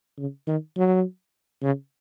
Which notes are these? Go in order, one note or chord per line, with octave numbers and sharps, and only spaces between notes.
C#3
D#3
F#3
C#3